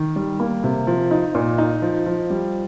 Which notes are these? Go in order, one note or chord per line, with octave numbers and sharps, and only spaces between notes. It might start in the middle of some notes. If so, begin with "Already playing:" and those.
Already playing: D#3
G3
A#3
C3
F3
D#4
A#2
D#4
F3
F3
G3